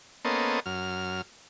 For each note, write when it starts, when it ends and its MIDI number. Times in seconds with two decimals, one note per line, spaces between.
0.25 0.60 58
0.25 0.60 59
0.25 0.60 61
0.25 0.60 69
0.25 0.60 72
0.25 0.60 75
0.66 1.22 42
0.66 1.22 89